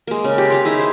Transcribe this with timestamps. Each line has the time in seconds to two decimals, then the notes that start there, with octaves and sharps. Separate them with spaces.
0.07 G#3 A#3
0.24 C#3
0.38 G4
0.50 G#4 F5 C6
0.65 D#4 E4 G#4
0.80 C5